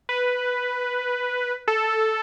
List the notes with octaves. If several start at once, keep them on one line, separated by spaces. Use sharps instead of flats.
B4
A4